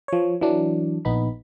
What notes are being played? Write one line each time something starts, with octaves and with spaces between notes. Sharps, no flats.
F3 C#5
E3 F#3 D4
A#1 B3 D#4 B5